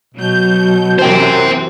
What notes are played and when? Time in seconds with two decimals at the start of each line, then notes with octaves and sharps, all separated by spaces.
0.14 B2 F#3 G6
0.99 F#2 C3 E3 C5 G5